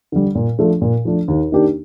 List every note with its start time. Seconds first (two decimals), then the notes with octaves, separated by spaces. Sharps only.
0.12 D3 G3
0.35 A#2
0.59 F3 A3 D4
0.82 A#2
1.05 F3 A3 D4
1.28 D#2
1.52 D#3 A#3 D4 G4